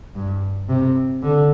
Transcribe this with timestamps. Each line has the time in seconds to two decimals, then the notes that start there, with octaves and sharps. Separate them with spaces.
0.15 G2
0.68 C3
1.23 D3